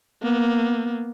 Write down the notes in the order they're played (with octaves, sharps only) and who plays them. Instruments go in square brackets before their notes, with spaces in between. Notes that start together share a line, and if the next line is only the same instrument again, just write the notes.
[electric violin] A#3 B3